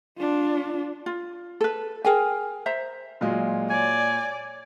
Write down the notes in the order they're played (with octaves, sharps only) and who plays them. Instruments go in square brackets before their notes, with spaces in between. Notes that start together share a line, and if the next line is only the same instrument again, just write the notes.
[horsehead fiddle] D4 F4
[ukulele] F4
A4 B4
G#4 A#4 G5 G#5
C5 E5 A#5
[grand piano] A#2 F4 [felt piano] F#3 G#3 G#4
[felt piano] C#5 [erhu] D5 [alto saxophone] G#5